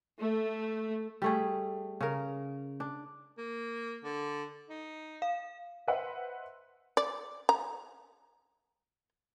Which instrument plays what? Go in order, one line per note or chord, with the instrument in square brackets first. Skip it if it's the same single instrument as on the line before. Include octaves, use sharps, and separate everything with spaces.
[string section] A3
[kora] G3 A3 G#4
C#3 A#4
D4
[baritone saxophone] A#3
D3
D#4
[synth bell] F5
[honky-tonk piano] B4 C5 D#5 E5 F#5 C6
[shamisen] D5
A#5